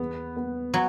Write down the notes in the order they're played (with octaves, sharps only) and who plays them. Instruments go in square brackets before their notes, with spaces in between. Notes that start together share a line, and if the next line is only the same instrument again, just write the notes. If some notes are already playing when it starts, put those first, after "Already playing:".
Already playing: [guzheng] E2 [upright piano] B3
[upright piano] B3
[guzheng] F#3